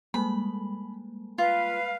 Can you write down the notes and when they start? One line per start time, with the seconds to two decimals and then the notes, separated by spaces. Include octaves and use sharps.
0.14 G3 G#3 A#3 B5
1.38 F4 B4 F5